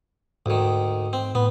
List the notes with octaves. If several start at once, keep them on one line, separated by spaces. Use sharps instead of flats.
D2 G#2 D#3
C4
A2 B3